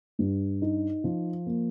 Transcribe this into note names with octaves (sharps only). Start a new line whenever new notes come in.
G2
D#4
F3
A#3